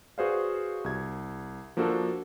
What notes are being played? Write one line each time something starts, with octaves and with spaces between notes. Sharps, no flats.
F#4 G#4 B4 C5 D5 F5
C2 G#6
F3 A#3 D4 F#4 A4